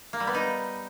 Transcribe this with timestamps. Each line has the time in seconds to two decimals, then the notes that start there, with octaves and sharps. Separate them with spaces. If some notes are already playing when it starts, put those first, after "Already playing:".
0.13 A#3
0.20 G3
0.27 B3
0.34 D#4